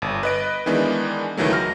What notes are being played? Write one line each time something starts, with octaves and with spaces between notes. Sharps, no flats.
G1
B4 D#5 D7
D#3 E3 G#3 B3 D4
C#2 D#3 E3 F#3 A3
F6 A#6